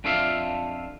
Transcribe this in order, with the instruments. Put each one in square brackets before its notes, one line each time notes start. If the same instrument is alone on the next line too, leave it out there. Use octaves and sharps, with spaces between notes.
[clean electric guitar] F2 D4 F4 A4 E5 F5